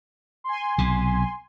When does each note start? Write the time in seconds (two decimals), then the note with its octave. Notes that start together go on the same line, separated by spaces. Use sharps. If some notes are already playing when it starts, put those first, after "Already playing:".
0.44 G#5 C6
0.78 B1 C3